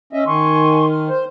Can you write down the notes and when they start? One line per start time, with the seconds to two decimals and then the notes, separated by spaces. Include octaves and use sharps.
0.13 C#4 D#5 E5
0.26 D#3 G#5 C6 C#6
0.90 F6
1.09 C5